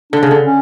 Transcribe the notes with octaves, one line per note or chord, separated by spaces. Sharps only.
D3 D4
C#3
D3
C#4